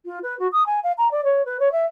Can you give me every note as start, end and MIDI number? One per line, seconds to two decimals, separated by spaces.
0.05 0.19 65
0.23 0.38 71
0.39 0.47 66
0.52 0.66 87
0.66 0.80 80
0.83 0.92 77
0.98 1.11 82
1.11 1.24 74
1.24 1.45 73
1.45 1.58 71
1.60 1.71 73
1.72 1.85 76